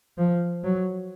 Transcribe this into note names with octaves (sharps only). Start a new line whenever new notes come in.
F3
F#3